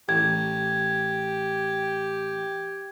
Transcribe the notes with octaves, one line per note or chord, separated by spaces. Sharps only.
A1 G4 G#6